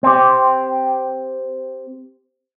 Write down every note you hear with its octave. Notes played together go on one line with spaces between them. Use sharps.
C4 G4